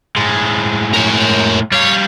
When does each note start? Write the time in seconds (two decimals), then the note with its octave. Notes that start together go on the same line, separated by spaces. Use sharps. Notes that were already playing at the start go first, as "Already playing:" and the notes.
0.16 A2 G#3
0.93 A#4 C#5
1.72 G3 C#5 F5